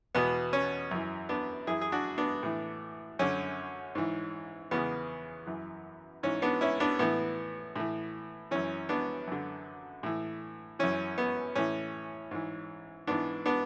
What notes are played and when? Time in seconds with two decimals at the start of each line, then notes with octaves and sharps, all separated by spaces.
0.15 E2 B2 B3
0.53 C#4
0.91 F#2 E3
1.29 B3 D4
1.67 F#2 E3 E4 G#4
1.81 G#4
1.92 D4 F#4
2.18 B3 D4
2.43 A2 E3
3.19 F#2 D3 C#4
3.95 G#2 E3
4.71 E2 C#3 E3 B3
5.47 F#2 E3
6.23 G#2 E3 C#4
6.42 B3 D4
6.61 C#4 E4
6.80 B3 D4
6.99 A2 E3 B3
7.76 A2 E3
8.51 F#2 E3 C#4
8.89 B3 D4
9.27 F#2 D3
10.03 A2 E3
10.79 F#2 E3 C#4
11.18 B3
11.55 A2 E3 C#4
12.31 G#2 E3
13.07 G#2 E3 B3 D4
13.46 B3 D4